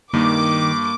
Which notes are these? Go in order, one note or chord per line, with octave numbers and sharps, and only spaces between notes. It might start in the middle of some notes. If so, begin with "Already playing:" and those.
G2 D#3 A#3 D6